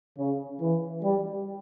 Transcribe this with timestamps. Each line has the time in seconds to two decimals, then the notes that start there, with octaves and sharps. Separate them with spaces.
0.19 C#3
0.61 E3
1.03 G3